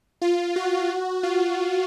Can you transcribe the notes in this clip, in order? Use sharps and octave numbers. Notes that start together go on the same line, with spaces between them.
F4
F#4
F4